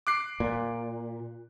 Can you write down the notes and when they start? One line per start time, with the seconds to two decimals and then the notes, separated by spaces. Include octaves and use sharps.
0.07 D6 F#6 C7
0.40 A#2